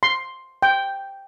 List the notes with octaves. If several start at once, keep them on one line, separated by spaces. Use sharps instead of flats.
C6
G5